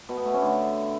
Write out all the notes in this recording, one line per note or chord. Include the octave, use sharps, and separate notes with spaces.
B2
B3
A3
C#4
D3